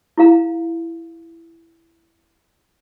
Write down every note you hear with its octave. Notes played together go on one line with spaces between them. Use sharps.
E4 G#4 F5 A#5